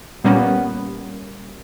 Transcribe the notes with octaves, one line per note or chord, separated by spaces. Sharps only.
A#2 G3 A#3 B3 C#4